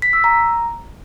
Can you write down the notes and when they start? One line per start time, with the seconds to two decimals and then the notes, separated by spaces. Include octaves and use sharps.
0.02 B6
0.13 E6
0.24 A#5